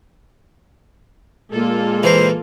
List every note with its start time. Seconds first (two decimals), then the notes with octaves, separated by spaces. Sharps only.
1.51 A#2 G#3 A#3 F4 A4
2.03 E3 A#4 C5